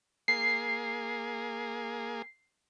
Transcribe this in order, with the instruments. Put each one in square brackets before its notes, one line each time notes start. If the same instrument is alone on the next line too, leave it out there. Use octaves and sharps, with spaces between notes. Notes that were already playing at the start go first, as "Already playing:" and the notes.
[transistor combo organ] A#3 G#4 [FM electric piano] C7